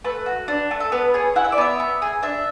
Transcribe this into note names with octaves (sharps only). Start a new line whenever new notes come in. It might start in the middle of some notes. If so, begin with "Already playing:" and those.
A3 B4
F#4
D4
A3
A4
B3 B4
G#4 C#5
E4 F#5
E5
D5
B3 E5
B3
G#4
D4 E5